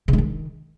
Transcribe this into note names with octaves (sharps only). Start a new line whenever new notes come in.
C#3
G#3
D#3